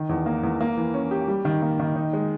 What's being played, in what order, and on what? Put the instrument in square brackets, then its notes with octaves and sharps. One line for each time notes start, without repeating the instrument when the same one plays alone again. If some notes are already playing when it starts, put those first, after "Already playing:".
Already playing: [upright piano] D#3
E2
A#3
E2
A#3
E3
C#4
G4
G3
D#3
A#3
D#3
D#4
G#3